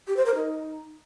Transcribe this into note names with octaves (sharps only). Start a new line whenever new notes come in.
G4
C5
A#4
D#4